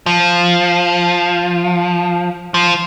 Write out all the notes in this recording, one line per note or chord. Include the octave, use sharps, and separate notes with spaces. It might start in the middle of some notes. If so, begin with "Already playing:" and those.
F3
F3